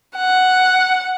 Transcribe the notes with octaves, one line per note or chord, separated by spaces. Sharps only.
F#5